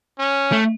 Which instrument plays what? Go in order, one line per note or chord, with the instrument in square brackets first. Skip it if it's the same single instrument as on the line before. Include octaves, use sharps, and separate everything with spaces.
[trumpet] C#4
[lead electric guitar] A3